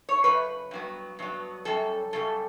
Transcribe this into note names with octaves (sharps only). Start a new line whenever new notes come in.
C#5
F#2 C#3 B4
G2 F#3 B3
G2 F#3 B3
F#2 C#3 G3 A4
F#2 C#3 G3 A4